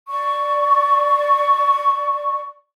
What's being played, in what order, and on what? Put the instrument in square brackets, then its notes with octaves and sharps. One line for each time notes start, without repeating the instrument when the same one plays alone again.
[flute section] D5 C#6